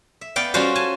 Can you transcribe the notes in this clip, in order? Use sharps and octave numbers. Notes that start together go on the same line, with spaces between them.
E5
B3 D5 F5 G5
G3 C#4 F4 F#4 C5 F5
G#5 A5